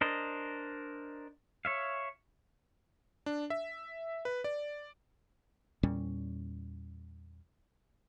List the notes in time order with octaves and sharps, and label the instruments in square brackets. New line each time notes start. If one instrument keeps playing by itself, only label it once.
[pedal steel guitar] D4 A#4 C5 D#5
C#5 E5 F5
[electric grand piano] D4
E5
B4
D5
[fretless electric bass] E2 A#2 G3 C#4